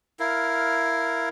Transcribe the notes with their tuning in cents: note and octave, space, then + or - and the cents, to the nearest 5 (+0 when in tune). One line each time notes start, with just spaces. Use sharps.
E4 +5 A#4 +0 F5 +0